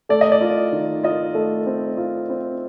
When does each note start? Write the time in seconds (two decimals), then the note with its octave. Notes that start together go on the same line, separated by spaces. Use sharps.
0.09 A3 D5
0.21 D#5
0.32 D5
0.41 F4
0.72 D#3
1.03 F4 D#5
1.34 A3
1.66 C4
1.97 F4
2.29 C4